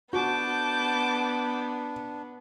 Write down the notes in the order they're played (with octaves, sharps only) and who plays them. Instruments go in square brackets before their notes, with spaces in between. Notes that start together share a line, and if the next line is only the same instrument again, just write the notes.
[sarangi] B3 [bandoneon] D4 [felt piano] F#4 [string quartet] A5 D6 G6